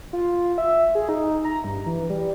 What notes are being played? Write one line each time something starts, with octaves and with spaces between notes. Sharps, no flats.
F4
E5
G#4
D#4
A#5
G2
E3
G3